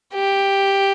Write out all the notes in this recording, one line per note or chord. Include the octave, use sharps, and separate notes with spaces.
G4